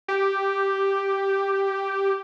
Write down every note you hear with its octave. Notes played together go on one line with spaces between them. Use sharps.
G4